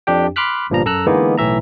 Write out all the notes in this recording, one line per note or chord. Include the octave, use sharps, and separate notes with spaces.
F2 D4 G4 G5
B5 C6 D6 F6 F#6 B6
G1 G2 A#2 F3 G3 A#5
F#2 A4 A#5 E6 F#6
D3 E3 G#3 A#3 B3 D#4
B1 A2 E3 E5 A#5